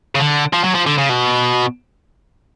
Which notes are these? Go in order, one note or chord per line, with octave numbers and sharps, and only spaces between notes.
C#3
D3
F3
F#3
F3
D3
C#3
B2